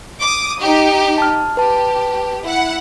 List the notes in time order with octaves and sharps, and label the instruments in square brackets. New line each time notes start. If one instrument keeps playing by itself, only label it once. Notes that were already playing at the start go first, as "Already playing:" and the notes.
[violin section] D6 D#6
D#4 G4
[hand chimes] A5 F6
[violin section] G4 [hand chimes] B4 A5
[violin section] E4 F#5